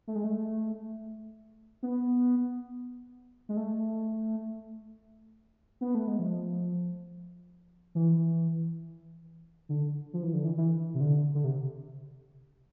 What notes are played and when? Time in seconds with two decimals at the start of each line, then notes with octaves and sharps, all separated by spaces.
0.07 A3
0.15 G#3
0.24 A3
1.83 B3
3.49 G#3
3.57 A3
5.81 B3
5.95 A3
6.08 G#3
6.19 F3
7.95 E3
9.69 D3
10.13 F3
10.23 E3
10.33 D3
10.45 E3
10.57 E3
10.94 C3
11.01 D3
11.35 D3
11.44 C3